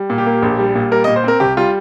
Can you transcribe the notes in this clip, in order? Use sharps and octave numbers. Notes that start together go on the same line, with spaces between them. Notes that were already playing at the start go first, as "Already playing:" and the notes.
Already playing: G3
A#2
G4
A#3
A#1
G3
A#2
G3 A#4
A#2 D#5
C5
C4 A#4
C2 G4
G3 F4